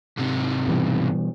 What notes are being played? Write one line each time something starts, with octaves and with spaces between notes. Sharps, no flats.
G#2 C3
B2 E3 G3